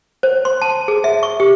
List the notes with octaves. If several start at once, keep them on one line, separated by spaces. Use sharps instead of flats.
C5
C6
A5
G#4
E5
C#6
G4